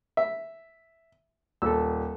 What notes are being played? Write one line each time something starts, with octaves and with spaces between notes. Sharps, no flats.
E5
D#1 A4 E6